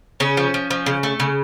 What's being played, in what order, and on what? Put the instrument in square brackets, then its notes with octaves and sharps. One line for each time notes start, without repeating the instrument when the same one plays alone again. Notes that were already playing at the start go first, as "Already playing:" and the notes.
[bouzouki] C#3 C#4
F3
F3
F3
C#3
A3
C#3